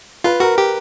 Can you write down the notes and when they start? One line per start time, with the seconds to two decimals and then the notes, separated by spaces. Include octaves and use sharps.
0.24 F4 B4
0.40 F#4 A#4
0.58 G4